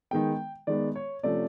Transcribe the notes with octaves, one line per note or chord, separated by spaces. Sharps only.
D#3 G#3 B3 G5
D#3 G#3 B3 D5
C#5
C3 F3 A3 C#4 D5